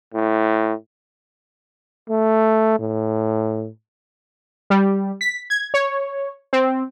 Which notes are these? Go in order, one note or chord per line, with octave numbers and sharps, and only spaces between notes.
A2
A3
A2
G3
B6
G#6
C#5
C4